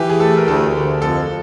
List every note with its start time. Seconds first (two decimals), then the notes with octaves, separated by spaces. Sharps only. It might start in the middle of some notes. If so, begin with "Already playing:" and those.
Already playing: E3 G4
0.10 G#4
0.20 A3 A4
0.37 A#4
0.48 D2 A4
0.75 D2
1.02 F2 A4